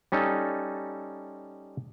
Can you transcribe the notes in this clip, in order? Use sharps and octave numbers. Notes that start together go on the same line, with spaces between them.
G3 C#4 D#4 A4